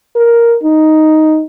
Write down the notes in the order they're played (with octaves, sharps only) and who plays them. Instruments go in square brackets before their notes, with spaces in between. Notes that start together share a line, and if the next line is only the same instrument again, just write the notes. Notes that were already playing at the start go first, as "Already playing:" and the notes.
[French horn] A#4
D#4